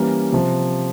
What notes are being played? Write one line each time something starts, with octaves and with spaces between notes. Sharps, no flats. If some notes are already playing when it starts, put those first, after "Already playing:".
Already playing: E3 G3 A#3 C#4
C3 F3